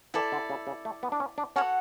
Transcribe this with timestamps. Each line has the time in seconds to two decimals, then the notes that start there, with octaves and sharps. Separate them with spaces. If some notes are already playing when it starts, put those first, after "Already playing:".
0.14 E3 E4 A4 D5
0.32 D3
0.50 C#3
0.67 C#3
0.85 A3
1.03 B3
1.12 D4
1.20 C#4
1.38 D4
1.56 C#4 F#4 A4 C#5 F#5